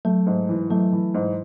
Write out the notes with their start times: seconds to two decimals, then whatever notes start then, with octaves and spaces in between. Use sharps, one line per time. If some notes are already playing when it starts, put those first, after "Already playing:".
0.05 F#3 A3
0.27 G#2
0.49 E3
0.70 F#3 A3
0.92 E3
1.15 G#2